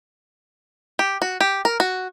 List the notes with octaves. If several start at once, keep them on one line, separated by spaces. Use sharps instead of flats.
G4
F#4
G4
A#4
F#4